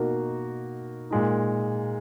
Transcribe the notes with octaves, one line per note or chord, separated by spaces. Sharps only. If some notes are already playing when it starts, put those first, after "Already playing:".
Already playing: B2 A#3 D#4 F#4
A#2 G#3 D#4